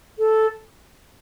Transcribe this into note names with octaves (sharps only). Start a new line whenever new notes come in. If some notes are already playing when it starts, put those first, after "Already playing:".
A4